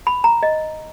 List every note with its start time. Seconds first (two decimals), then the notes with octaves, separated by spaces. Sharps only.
0.07 B5
0.24 A#5
0.43 D#5